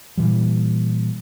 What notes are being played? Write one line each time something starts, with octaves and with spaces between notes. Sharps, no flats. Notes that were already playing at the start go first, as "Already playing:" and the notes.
A#2 E3 G3